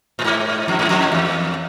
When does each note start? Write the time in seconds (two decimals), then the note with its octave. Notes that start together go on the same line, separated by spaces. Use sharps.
0.19 A2
0.24 G#2
0.68 F2
0.79 G#2
0.89 F2
1.12 E2